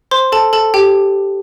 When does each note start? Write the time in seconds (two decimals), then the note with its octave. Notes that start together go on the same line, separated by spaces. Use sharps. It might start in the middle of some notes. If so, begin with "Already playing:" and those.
0.11 C5 C6
0.32 A4 A5
0.53 A4 A5
0.74 G4 G5